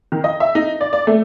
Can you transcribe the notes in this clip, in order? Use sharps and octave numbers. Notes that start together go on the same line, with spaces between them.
D#3
D#5
E5
D#4
D5
D5
A3